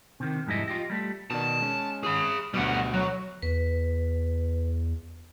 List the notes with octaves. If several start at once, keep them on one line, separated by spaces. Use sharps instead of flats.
C3 D#3
F2 G#2 G3 E4 D#5
F4 G4 D#5
G3 A3
B2 D#3 D5 A5
G#3 C#4
G#4 B5
D2 B2 G3 F#5
F#3
E2 B4